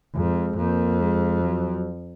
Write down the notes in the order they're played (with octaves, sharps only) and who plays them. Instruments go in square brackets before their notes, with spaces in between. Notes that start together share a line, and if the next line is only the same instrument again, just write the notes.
[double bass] F2 [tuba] G#3
[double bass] F2 [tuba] A#3
[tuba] G#3
F#3